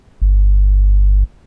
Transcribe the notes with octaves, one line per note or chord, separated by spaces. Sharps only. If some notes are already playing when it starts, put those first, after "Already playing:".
G1